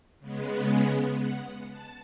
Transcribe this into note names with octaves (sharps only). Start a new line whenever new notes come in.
C#3 G#3 B3
F#5
A5